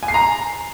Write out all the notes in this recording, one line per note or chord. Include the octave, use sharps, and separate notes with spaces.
G#5
C7
A#5